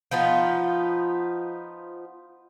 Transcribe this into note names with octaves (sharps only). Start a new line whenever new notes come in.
F3 B3 D#4 F4